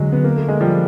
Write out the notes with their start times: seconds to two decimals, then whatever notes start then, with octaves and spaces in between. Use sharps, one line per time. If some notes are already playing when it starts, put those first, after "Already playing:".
Already playing: D3 F#3 G#3
0.12 B3
0.24 A#3
0.36 A3
0.48 G#3
0.61 F3 G3